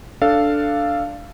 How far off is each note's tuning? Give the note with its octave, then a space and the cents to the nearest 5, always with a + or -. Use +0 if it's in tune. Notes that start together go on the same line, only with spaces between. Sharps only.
D4 +0 A4 +0 F5 -10